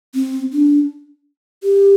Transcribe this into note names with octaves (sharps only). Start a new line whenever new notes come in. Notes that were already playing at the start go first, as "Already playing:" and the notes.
C4
D4
G4